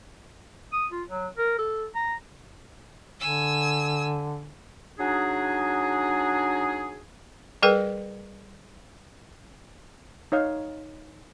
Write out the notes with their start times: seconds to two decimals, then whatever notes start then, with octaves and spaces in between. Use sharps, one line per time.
0.73 D#6
0.92 F4
1.10 F#3
1.38 A#4
1.58 A4
1.95 A#5
3.20 D3 G#5 E6
4.99 F#3 D4 D#4 G#4
7.62 G3 G#4 A#4 B4 G5
10.32 D#4 C#5 F5